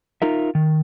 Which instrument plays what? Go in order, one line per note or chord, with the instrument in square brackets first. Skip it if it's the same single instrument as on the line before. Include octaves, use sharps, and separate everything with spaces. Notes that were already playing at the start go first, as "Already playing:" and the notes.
[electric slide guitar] D#4 F4 A#4 E5
D#3